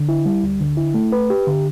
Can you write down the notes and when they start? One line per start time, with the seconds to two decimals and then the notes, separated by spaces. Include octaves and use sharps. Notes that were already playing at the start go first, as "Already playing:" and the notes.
Already playing: D3
0.09 E4
0.26 G3
0.43 D2
0.60 D3
0.77 E4
0.94 A3
1.12 B4
1.30 G4
1.47 D3